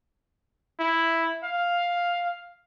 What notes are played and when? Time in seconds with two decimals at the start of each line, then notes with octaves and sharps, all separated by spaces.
0.80 E4
1.43 F5